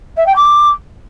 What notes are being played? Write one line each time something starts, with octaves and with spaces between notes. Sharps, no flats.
E5
G5
D6